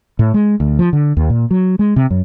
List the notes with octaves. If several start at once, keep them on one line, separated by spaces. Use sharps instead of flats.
A2
G#3
D2
F3
D3
D#2
A#2
F#3
G#3
C3
F#2